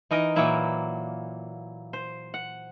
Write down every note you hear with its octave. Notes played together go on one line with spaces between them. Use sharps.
E3 D#4 A#4 D#5
A#2 E3 F#3 A#3 E4 E5
C5
F#5